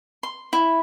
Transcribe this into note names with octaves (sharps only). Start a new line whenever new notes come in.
C6
E4